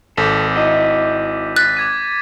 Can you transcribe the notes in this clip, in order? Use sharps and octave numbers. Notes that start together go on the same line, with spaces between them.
G#1 A4 D6 G6 B6
E4 F#4 D#5 D#7
F#6 A6 B6
D6 G#6 D#7